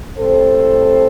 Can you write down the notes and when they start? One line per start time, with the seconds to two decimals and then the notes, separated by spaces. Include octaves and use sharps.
0.17 A2 G3 C4 A4 C5